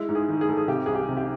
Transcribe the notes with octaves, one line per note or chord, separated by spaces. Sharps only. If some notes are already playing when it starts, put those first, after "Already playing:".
Already playing: G#3 E4
G#2
G#4
D#3
G#4
G#2 A4
G#4
C3 G4
C2 G#4
G4
C3
G4